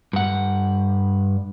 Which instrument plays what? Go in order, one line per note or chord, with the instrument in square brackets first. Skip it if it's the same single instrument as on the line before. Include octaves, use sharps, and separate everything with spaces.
[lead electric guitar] G2 F#5